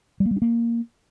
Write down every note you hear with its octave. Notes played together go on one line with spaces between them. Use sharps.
G3
A#3
G3
D4
A#3